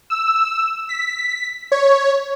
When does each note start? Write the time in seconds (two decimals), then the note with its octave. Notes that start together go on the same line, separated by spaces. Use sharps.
0.10 E6
0.89 B6
1.72 C#5